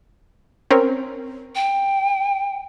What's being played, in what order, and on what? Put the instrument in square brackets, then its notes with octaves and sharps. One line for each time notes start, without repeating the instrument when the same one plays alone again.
[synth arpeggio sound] C4 C#4 A#4
[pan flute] G5